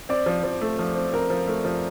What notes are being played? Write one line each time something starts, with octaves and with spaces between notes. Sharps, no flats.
C4 D5
F3
F3
A3
F3
C4
C4 A#4
F3
A3
F3